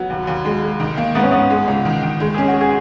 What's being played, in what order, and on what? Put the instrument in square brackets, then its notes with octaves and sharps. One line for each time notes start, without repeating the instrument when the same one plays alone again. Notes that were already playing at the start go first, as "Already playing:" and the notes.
Already playing: [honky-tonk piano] F#3 [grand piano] B3
[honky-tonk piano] D#2
D#2
G#3
G#3
D#3
A#3
[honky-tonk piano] G#2 [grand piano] B3
[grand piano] C#4
[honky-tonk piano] G#2 [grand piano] B3
[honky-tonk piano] G#3
C#2
D#3
D#3
G#3
[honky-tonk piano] C#4 [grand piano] G#4
[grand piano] F#4
G#4